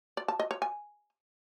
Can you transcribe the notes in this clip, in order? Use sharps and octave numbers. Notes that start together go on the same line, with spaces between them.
D5
A5
D#5
C#5
G#5